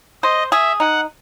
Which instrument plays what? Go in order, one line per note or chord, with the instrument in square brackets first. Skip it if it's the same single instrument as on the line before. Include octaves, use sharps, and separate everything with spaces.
[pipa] C5 [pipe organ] D#5
[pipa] G#4 [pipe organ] E5
[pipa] D#4 [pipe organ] F#5